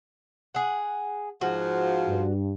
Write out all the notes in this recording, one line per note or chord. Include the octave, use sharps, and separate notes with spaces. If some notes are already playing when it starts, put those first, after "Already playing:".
G#4 F#5
G#2 F3 F#4
G2